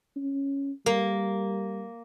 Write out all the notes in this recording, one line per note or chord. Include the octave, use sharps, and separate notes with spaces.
C#4
G3 A#3